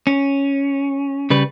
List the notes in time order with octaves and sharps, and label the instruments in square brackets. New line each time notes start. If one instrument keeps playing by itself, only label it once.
[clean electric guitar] C#4
C#3 G3 B4